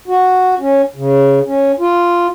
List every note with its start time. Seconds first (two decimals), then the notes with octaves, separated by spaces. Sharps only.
0.08 F#4
0.60 C#4
0.96 C#3
1.46 C#4
1.80 F4